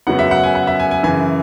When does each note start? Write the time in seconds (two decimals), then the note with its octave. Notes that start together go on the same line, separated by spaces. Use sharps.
0.07 F#2 C#3 F#3 B3 F#5
0.19 E5
0.31 F#5
0.43 G#5
0.55 F#5
0.67 E5
0.80 G#5
0.91 G#5
1.03 F#2 C#3 E3 G#5